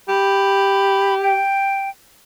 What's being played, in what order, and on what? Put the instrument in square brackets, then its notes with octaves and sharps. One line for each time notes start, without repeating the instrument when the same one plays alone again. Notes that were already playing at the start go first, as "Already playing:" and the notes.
[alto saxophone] G4 [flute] B5
[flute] G5